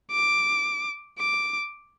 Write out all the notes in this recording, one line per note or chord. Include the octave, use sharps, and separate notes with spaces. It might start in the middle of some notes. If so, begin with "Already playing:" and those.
D6
D6